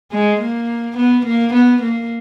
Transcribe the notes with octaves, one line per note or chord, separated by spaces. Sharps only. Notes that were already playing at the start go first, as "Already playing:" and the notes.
G#3
A#3
B3
A#3
B3
A#3